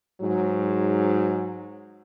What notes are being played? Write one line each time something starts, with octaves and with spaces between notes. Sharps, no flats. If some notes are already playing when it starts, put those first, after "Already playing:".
G#2 F#3